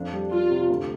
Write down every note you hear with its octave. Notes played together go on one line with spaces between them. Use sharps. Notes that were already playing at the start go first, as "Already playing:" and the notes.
Already playing: F2 D4
G3
G3 F4
C3
D2